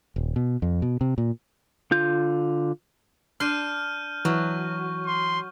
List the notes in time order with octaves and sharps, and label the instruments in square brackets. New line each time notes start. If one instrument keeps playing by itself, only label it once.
[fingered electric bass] D#1
B2
F2
B2
C3
A#2
[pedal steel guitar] D3 F4 G6
[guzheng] D4 C6 [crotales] F6 G6 D#7
[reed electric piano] E3 [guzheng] F#3 [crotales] C#6
[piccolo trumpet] C6